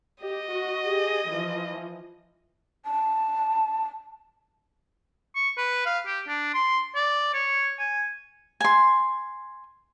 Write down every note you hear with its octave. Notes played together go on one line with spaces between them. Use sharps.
G4 D#5
F#4
G4 G#4
E3 F3
A5
C#6
B4
F5
G4
D4
C6
D5
C#5
G#5
G#5 C6